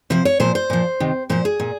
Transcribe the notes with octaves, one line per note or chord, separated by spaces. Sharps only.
C3 F3 C5
C#5
A#2 F3 C5
C5
A#2 F3
C3 D#3
A#2 F3 C5
G#4
A#2